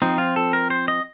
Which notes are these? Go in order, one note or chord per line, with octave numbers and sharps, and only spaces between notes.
F3 C4 D#4
F4
A4
A#4
C5
D#5